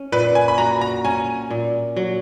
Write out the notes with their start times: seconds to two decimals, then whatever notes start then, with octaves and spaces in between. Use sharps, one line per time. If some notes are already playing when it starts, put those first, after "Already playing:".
Already playing: C#4
0.12 A#2 B4
0.35 G#5
0.48 B5
0.58 F#4 A#5
0.81 A#5
1.05 C#4 G#5
1.50 A#2
1.97 F#3